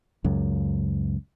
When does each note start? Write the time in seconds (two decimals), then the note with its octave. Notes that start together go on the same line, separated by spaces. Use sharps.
0.24 C#2 F#2